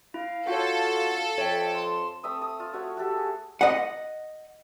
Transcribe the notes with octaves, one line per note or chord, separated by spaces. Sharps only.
E4 F5
F4 F#4 A4 C#5
F2 C#5 E5 G5
A5 C6
A3 C4 E5 D#6
D#6
F4
A3 F#4 C#5 E5
F#4 G4 A4 E5
G#4
D#5 F#5